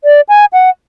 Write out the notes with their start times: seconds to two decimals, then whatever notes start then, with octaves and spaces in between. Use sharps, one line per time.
0.04 D5
0.29 G#5
0.53 F#5